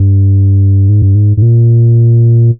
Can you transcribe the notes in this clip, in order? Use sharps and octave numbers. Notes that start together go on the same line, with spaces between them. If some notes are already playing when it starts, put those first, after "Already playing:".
Already playing: G2
G#2
G2
G#2
G#2
A#2